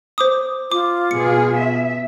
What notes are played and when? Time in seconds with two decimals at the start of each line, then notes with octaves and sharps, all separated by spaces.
0.18 C5 D6 D#6
0.72 F4 D6
1.11 B2 G#4 C#7
1.56 E5